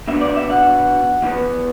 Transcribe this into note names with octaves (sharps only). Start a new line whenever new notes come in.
B2 B3 D4 E5
D5
E5
F#5
E2 E3 B3